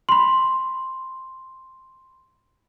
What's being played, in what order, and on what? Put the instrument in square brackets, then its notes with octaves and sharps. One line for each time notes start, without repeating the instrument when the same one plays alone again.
[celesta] B5 C6